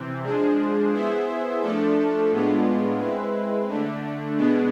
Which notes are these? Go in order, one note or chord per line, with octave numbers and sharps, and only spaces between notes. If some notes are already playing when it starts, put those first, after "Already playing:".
Already playing: C3 E3 C4
F3 G#3 D4 G#4 C5
B3 E4 G#4 C5 E5
F3 A3 D4 A4
A2 G#3 B3 D4 F4
G#3 C4 E4 B4
D3 A3 D4
B2 G#3 B3 D4